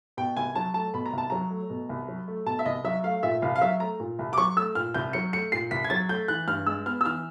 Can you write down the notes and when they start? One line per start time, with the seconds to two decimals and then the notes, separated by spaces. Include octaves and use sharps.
0.17 B2 G5
0.37 C2 G#5
0.55 F#3 A5
0.74 A3 A5
0.94 B2 B5
1.06 A#5
1.13 C2 A5
1.30 F#3 A#5
1.51 A3
1.70 B2
1.89 C2
2.08 F#3
2.28 A3
2.46 B2 A5
2.59 E5
2.66 C2 D#5
2.84 F#3 E5
3.04 A3 F5
3.23 A#2 E5
3.42 C2 F5
3.56 F5
3.61 F#3 E5
3.80 A3 A#5
4.00 A#2
4.19 C2
4.33 D6
4.38 F#3 C#6
4.56 A3 E6
4.75 A#2 F6
4.94 C2 G6
5.13 F#3 C#7
5.33 A3 C#7
5.52 A#2 C7
5.71 C2 B6
5.84 G#6
5.90 F#3 A6
6.09 A3 G6
6.28 E3 F#6
6.48 G2 F6
6.66 G#3 E6
6.86 B3 F6
7.01 E6
7.05 E3 F6